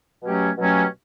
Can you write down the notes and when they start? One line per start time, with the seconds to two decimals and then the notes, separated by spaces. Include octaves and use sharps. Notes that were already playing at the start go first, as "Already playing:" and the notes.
0.23 B2 F#3 A3 C#4 G4
0.58 B2 F#3 A3 C#4 G4